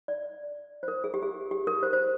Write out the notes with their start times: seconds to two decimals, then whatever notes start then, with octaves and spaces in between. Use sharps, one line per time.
0.08 D5
0.83 C5
0.88 A#4
1.04 G#4
1.14 G4
1.22 G#4
1.51 G4
1.67 A#4
1.83 C5
1.93 C5